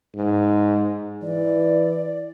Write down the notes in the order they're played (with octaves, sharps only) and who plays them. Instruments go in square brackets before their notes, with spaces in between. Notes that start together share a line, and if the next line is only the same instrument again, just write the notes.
[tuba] G#2
[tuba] E3 [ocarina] D5